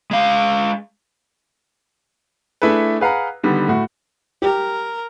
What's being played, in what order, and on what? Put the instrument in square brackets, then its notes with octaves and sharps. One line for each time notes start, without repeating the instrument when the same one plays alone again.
[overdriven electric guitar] G#3 F5
[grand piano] A3 D4 E4 G#4 A4 B4
G#4 B4 F5 F#5 A#5
D3 D#3 G3 B3
A2 A3 F#4
[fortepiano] G4 [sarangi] A#4